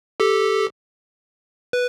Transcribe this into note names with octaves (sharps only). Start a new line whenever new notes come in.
G4 A4
B4